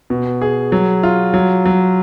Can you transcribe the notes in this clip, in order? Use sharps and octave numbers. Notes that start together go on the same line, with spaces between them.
B2
G#4
F#3
F4
F#3
F#3